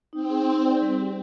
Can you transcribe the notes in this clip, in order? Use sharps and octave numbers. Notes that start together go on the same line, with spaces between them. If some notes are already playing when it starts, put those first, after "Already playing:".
C4 D#4
G#4
D#4
D5
G3
G4